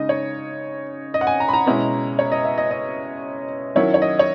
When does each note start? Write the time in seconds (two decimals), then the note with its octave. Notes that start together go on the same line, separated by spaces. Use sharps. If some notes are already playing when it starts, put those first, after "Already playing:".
Already playing: C#3 G#3 D#4 D#5
0.09 C#5
1.14 D#5
1.21 F#5
1.27 G#5
1.40 A#5
1.48 B5
1.53 A#5
1.66 B2 G#3 C#4 E4
2.19 C#5
2.32 D#5
2.45 E5
2.58 D#5
2.71 D#5
3.75 D#3 F#3 C#4 E4 C#5
3.94 C#5
4.02 D#5
4.19 C#5